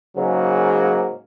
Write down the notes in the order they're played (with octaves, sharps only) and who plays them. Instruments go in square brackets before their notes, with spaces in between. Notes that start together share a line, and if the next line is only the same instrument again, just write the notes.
[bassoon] G#2 [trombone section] C#3 F#3 A#3